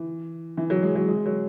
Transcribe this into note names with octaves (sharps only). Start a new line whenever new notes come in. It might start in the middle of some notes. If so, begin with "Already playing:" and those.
Already playing: E3
E3
F#3
G#3
F#3
G#3
F#3